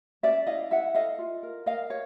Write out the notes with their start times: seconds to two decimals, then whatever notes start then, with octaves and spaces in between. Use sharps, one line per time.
0.23 C#4 D5 E5
0.46 E4 D#5 F5
0.71 E4 E5 F#5
0.94 A4 D#5 F5
1.18 F4
1.43 A#4
1.66 A#4 D#5 F5
1.90 C#5